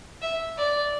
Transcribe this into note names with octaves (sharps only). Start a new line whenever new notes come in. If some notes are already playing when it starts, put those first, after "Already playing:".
E5
D5